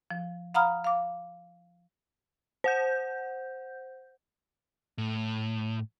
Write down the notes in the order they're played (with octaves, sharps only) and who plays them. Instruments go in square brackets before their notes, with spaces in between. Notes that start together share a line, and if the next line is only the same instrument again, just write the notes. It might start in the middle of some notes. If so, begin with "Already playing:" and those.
[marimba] F3
F5 F#5 A#5 B5 D#6 F6
F5 D6
[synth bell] C5 F#5 G6
[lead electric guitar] A2